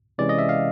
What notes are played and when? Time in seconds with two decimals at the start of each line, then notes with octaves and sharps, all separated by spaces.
0.18 C3 E3 G#3 C#4 D5
0.29 D#5
0.38 E5
0.49 F5